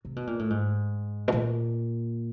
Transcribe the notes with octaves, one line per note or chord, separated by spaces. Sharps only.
C3
B2
A#2
A2
G#2
B2
A#2